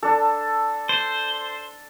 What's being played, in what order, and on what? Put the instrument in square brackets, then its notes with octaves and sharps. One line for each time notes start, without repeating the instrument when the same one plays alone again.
[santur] D4 A4
[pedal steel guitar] C5